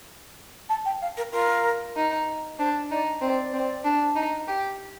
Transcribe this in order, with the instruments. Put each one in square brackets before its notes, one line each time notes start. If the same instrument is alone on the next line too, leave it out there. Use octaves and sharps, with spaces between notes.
[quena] A5
G5
F5
A#4
[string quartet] F4 [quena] A#4
[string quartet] D#4
[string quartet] D4 [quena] C5
[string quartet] D#4 [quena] D5
[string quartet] C4 [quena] D5
[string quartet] C4
D4
D#4
G4